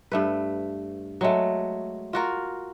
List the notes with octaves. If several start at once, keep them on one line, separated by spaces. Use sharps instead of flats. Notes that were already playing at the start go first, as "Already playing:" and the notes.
G2 A3 B4
F#3 G#3 A3
F4 F#4 A#4